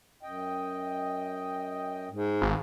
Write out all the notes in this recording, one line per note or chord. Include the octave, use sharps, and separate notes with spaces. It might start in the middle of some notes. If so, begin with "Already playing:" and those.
F#2 D#5 G5
G#2
G#1 D2 F5